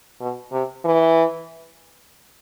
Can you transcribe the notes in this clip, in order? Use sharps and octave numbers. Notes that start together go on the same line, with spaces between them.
B2
C3
E3